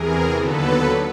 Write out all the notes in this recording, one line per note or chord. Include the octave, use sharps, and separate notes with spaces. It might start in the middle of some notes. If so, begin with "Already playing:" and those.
Already playing: E2 C3 E3 G#4 A#4
D#2 D3 F#3 B3 A4 B4